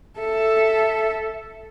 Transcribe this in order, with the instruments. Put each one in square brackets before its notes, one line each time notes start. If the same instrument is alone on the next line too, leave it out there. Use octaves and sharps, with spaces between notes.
[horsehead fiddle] A4 E5